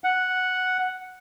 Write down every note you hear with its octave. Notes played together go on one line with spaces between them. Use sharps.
F#5